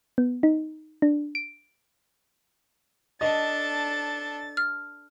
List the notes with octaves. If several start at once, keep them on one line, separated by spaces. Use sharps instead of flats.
B3
D#4
D4
D7
D4 A4 D#5 A6
F6